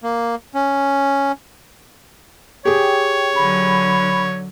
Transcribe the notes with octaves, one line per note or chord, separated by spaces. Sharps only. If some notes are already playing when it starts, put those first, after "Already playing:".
A#3
C#4
G4 G#4 C#5 G5
D3 F#3 B5